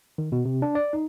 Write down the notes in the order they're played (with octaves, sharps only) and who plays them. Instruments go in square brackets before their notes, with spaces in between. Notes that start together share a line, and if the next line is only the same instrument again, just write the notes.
[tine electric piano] D#3
B2
C3
D4
D5
D#4